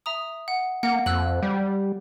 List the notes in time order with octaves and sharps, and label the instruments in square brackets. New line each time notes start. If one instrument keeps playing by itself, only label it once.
[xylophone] E5 A#5 D#6
F#5
[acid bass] A#3 [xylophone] F#5
[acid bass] F2 [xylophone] E6 F#6 F#7
[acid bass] G3